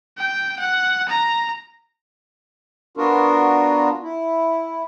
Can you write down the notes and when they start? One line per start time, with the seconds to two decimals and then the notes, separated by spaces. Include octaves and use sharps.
0.17 G5
0.59 F#5
1.08 A#5
2.97 B3 D4 F4 F#4 A#4
4.02 E4